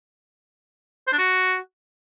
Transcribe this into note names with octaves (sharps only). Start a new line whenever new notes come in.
C5
D4
F#4